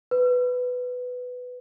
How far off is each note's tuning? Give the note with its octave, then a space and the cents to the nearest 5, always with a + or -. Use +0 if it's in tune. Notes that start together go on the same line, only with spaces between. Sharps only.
B4 +10